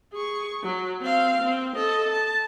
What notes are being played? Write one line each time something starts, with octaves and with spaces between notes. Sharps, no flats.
G#4 C#6
F#3
C4 F5
C4
A4 D#5
A5